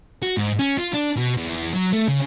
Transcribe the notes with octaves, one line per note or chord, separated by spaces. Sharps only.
F#4
G#2
C#4
F4
D4
B2
E2
F#3
A3
C#3